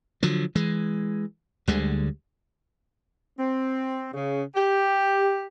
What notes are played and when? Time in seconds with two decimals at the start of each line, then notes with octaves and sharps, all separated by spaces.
0.23 D3 F3 F#3
0.55 E3 G#3
1.67 D2 D3 G3 G#3
3.38 C4
4.13 C#3
4.55 G4